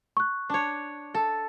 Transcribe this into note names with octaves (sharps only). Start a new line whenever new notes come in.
C#6 F#6
D4 C#5
A4